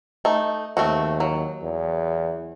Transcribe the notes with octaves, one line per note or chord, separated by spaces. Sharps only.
A3 D#4
D#2 A3 C4 F#4
F#3
E2